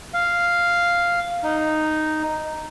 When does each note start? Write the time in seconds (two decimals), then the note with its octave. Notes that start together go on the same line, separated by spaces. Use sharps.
0.14 F5
1.44 D#4